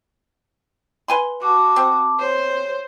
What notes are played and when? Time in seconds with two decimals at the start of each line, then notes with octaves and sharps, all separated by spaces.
1.08 B4 G#5 C6
1.42 F#4 A5 D6
1.76 C4
2.19 C5 C#5